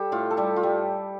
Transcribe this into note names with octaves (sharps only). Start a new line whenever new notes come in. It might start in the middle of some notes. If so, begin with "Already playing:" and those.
Already playing: G3 G4 A4
A2 F4
A4
G3 G4
F4
G3